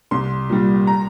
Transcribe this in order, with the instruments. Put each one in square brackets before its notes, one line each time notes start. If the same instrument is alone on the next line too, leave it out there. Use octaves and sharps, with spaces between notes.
[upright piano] C2 C6
A#2 G3
A#5